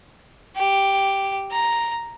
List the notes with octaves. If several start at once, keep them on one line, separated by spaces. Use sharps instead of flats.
G4
A#5